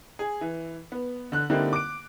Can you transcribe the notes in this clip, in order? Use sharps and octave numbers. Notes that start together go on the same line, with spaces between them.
G#4
E3
B3
D3 F#6
D3 G3 A#3 C4 D#4 E4
D6 D7